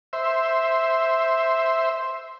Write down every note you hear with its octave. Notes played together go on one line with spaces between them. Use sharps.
C5 E5